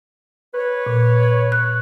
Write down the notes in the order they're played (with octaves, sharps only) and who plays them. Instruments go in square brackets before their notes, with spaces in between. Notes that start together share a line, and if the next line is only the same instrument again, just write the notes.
[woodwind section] B4 C#5
[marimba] A#2
F#6